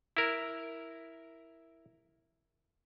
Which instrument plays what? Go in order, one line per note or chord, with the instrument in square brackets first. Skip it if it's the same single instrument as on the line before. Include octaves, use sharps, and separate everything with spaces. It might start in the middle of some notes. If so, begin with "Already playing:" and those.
[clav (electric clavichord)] E4 A#4